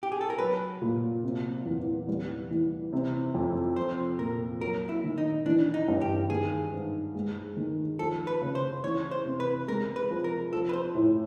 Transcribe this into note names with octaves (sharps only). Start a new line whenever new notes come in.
G4
G#4
A4
A#4
F#3 B4
A#2
C3
E2
G3
E3
C3
F2
F3 C5
A#2 A#4
F#3 A#4
E4
D#3
D#4
E3 D4
D#4
G2
G4
D#3 G#4
G#2
G#3
D#3
F3 A4
B4
C#3
C5
E3 C#5
C5
C3
B4
G#3 A#4
B4
F3
A#4
F3 A4
B4
C5
A2